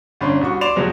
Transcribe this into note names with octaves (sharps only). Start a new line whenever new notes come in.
G1 C#4 D4 C6
C2 F#4 C#6
D5 C6 E7 F7
F2 C3 F3 F#3 G#3